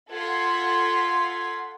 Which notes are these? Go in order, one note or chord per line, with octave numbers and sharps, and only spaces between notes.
F4 A4 F#5 C6 G#6 B6